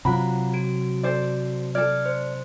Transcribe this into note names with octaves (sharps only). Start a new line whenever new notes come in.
C3 F#3 F4 F#5 A#5 B5
F#4 D7
A4 C5 D5
A4 D5 F6 G#6
C5